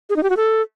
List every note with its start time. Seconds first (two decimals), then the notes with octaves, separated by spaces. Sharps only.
0.10 G#4
0.16 D#4
0.23 G4
0.30 F#4
0.37 A4